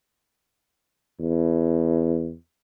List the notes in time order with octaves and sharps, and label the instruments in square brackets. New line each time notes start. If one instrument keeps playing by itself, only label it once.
[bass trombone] E2